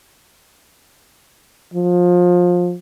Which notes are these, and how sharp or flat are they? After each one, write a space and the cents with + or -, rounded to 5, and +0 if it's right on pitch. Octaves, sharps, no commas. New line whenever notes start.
F3 +25